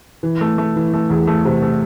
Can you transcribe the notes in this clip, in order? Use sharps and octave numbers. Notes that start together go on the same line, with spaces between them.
E3
A3
A3
E3
A3
E2
A3
C3
A3